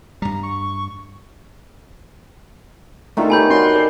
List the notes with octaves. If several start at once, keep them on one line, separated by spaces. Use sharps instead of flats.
G2 G3 A#5
C#6
D#3 A3 D4 F4 A4 A#5
B3 G4 C#5 G#5 B5 G6
C#4 F#4 D5 C6
D#5 F#5 C6
A4 D5 G5